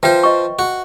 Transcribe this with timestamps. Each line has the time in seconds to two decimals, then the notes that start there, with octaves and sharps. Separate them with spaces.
0.03 F3 B4 C5 E5 G5
0.24 D#5 C#6
0.59 F#4